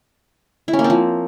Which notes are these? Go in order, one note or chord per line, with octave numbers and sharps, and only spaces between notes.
E4
C#4
A#3
C4
F3